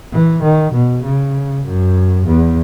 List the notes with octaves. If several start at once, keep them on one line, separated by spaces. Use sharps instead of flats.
E3
D#3
B2
C#3
F#2
E2